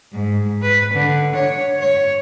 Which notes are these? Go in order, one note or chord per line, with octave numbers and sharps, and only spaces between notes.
G#2
B4
D3
C#5
C#5